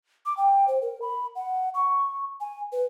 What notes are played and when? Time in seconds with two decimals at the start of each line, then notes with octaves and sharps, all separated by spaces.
0.26 D6
0.37 G5
0.68 C5
0.82 A#4
1.02 B5
1.36 F#5
1.74 C#6
2.40 G#5
2.72 B4